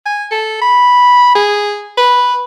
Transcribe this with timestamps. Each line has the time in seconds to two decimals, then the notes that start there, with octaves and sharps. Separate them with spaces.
0.06 G#5
0.31 A4
0.62 B5
1.35 G#4
1.98 B4